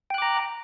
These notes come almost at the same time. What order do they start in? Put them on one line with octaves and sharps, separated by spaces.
G5 F#6 D6 A#5